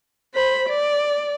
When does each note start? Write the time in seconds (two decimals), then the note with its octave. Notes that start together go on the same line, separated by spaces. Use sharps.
0.34 C5 B5
0.69 D5